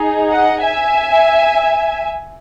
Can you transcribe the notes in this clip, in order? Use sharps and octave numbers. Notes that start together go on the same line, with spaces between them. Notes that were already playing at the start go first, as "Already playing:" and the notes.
Already playing: D#4 G#4
D#5 F#5
E5 G#5